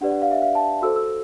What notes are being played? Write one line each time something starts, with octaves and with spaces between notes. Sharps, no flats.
D4 G4 B4 D5 F#5
F#5
F5
E5
F5
A5
F#4 A4 C5 E6
E6